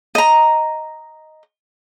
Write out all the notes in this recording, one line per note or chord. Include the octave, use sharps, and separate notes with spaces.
D#5 A#5